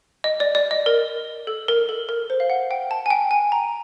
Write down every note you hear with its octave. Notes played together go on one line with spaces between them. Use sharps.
D#5
D5
D5
D#5
A#4
A4
A#4
A4
A#4
C5
F5
F#5
G5
A5
G#5
G5
G#5
A#5